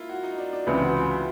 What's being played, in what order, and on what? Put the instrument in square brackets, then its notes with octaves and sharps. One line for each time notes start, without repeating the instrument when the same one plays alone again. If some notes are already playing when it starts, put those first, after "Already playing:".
Already playing: [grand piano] A#3 E4 F4
F#4
D#4
D4
D4
[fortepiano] C#2 C3 E3 [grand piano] C#4
[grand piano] F#4
F4
E4